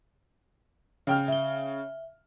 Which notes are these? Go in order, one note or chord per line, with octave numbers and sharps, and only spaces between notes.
C#3 G5 F6
E5 G7